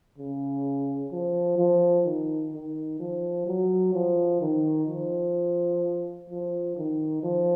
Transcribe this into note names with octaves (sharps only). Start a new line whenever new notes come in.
C#3
F3
F3
D#3
D#3
F3
F#3
F3
D#3
F3
F3
D#3
F3